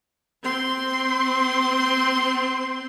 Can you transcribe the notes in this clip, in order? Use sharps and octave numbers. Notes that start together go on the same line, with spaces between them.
C4 C6